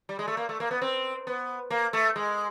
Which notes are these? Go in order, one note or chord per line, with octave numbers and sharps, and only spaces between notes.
G3
G#3
A3
A#3
A3
A#3
B3
C4
B3
A#3
A3
G#3